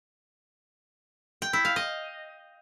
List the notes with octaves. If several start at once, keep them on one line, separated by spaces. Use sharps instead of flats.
G5
E4
F5
D#5